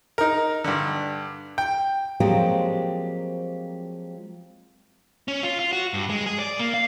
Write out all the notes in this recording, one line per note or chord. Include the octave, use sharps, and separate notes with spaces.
D#4 A#4
G2 D3
G5
F3 F#3 G#3 A#3 C4 G4
C#4
F4
F4
F#4
G2
G#3
G#4
D5
A#3
F5